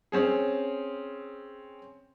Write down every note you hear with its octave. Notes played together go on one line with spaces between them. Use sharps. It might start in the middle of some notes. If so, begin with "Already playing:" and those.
C4 C#4 G#4